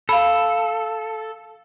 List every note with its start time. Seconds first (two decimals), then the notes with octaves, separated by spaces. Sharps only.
0.09 A4 F5 B5